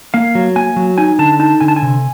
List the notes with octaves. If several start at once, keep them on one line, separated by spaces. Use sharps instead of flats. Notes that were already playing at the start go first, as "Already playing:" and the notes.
A#3 F5
F#3
A#3 G#5
F#3
D#4 G#5
D3 A5
D#4 A5
D3 G#5
A5
G#5
C3